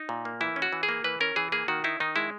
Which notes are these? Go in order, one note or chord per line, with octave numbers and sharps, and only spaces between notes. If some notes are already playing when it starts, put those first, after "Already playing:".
Already playing: D#4
A#2
A#3
E3 E4
C#4
F#4
E3
G#4
A#3
E3 B4
C#4 A#4
E3 G#4
A#3 G#4
D#3 F#4
D#4 E4
D#3 D#4
G#3 E4